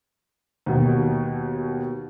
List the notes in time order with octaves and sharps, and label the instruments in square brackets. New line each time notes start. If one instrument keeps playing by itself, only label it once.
[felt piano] D#2 B2